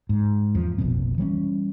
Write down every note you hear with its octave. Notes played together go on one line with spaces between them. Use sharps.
G#2
E2 F3
F1 A#1 B2 B3
E3 G3 A3 C#4